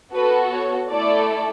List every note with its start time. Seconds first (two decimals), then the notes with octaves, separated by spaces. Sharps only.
0.14 B3 F#4 A4 B4
0.52 C#5
0.91 A3 E4 A4 D5